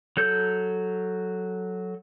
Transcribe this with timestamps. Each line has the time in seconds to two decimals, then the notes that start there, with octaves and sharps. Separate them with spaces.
0.17 F#3 A4 G6